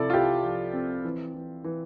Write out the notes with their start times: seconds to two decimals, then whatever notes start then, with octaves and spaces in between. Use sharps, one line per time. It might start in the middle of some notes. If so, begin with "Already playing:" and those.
Already playing: C3 F3 E4 A4 D5
0.10 F4
0.13 E4 G4
0.43 F3
0.73 C4
1.05 E3
1.34 E3
1.64 E3